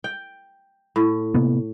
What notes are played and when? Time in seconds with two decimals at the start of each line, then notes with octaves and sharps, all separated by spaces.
0.04 G5
0.96 A2
1.35 C3 A#3 B3